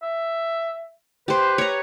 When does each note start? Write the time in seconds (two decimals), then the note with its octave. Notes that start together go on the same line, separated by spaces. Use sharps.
0.03 E5
1.28 G4 B4 C5
1.58 C#5 A#5